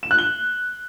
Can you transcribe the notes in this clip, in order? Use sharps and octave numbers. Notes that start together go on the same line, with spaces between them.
E7
F#6
G7